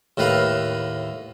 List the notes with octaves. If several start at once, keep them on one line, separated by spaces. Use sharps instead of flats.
D#2 A2 A#4 B4 F5